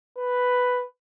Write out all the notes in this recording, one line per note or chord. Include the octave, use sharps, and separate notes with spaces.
B4